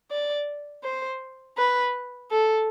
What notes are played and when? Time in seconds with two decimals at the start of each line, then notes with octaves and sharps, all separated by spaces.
0.11 D5
0.84 C5
1.58 B4
2.31 A4